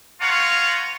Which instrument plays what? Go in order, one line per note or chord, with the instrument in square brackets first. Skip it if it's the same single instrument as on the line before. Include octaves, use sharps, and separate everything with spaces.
[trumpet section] B3 F4 C#5 F5 F#5 A#5